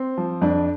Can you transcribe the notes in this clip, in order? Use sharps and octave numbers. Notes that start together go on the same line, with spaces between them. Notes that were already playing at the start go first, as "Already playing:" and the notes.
Already playing: C4
F3
F2 D4